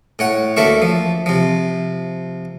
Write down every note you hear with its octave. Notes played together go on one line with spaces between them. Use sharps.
A2 C#5 F#5
D2 A#3 A4 E5 C#6
F3
C3 F3